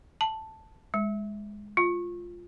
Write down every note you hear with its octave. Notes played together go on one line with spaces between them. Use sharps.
A5
G#3
F4